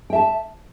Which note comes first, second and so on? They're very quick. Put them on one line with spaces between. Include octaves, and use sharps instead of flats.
G5 E5 A5